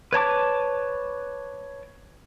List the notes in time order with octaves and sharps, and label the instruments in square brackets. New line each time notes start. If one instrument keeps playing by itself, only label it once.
[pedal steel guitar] B4 C#5 A5 D6